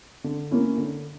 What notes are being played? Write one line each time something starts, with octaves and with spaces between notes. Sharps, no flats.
D3
A#3 C#4 E4
D3